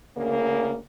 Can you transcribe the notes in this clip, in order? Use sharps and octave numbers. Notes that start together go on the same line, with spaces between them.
D2 C#3 A#3